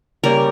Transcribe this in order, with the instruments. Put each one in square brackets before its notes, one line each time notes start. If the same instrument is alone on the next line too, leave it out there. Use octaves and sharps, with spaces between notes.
[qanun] C#3 G3 A#3 A#4